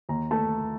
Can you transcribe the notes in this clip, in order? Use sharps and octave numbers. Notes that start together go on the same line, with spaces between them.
D#2 A#5
A3 A5